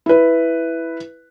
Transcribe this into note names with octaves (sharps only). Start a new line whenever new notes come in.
E4 B4